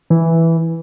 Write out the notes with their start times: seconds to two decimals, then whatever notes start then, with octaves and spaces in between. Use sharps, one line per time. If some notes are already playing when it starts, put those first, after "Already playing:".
0.10 E3